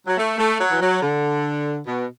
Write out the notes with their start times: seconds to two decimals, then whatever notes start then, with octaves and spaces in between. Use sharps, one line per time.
0.07 F#3
0.18 A3
0.39 A3
0.60 F#3
0.71 E3
0.81 F#3
1.02 D3
1.87 B2